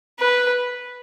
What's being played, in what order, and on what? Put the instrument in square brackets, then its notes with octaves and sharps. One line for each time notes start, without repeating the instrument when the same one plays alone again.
[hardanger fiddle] B4